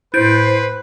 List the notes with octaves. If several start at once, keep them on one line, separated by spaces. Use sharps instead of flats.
A2 E4 B4 C5 G6 D7